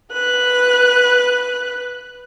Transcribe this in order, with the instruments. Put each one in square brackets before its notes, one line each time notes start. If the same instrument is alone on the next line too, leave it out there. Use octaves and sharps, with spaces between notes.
[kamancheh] B4 F#6